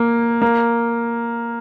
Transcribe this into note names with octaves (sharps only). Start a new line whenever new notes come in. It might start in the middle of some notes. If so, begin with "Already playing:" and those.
Already playing: A#3
A#3